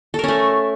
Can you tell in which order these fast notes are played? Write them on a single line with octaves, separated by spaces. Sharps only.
A4 A#4 C#4 A3